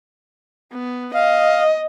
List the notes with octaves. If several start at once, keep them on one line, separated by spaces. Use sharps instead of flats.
B3
D#5 F5